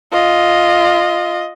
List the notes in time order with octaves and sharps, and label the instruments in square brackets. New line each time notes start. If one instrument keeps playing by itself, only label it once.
[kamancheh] F4 D#5